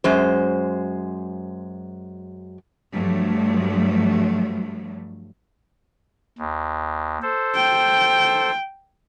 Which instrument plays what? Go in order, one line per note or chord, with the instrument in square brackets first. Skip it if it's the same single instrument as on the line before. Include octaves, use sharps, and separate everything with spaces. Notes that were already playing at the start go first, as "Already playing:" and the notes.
[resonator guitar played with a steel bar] F#2 G#3 C5
[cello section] G2 F3 F#3 A3
[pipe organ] D#2
A4 C5
[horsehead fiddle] G5